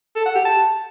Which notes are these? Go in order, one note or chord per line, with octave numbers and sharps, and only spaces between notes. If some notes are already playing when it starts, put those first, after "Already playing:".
A4
F#5
G4
A5